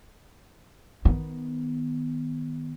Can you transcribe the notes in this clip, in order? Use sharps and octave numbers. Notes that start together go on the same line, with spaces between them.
D#3 B3